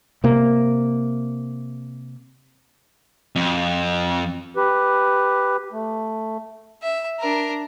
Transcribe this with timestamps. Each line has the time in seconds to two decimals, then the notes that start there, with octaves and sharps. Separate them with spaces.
0.24 C3 A#3
3.36 F2
4.56 G4 B4
5.73 A3
6.82 E5
7.19 D4 A#4